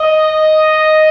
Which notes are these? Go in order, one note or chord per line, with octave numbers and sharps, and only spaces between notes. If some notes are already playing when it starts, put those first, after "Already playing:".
Already playing: D#5